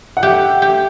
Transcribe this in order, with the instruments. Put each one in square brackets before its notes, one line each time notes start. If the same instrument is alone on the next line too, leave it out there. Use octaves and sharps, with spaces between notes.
[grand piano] F#5
[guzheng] G4 [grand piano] E5
[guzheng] G4